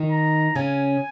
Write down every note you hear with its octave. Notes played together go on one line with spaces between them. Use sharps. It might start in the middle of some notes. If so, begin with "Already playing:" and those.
Already playing: D#3 D#4
A#5
C#3 C#4 G#5